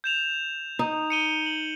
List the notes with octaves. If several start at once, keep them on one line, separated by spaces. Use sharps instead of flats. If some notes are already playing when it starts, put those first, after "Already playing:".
G6 E7 F7
D#4
C#7 D#7 G7
F#7